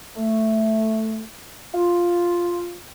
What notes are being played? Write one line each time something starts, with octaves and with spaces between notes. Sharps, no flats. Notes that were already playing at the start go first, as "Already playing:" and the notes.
A3
F4